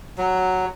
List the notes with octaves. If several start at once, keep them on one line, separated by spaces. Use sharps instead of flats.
F#3